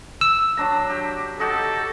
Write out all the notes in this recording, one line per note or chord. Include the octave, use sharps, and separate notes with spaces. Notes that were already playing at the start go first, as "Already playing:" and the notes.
E6
F#3 D4 A#5
G4
D#4 F#4 G4 A4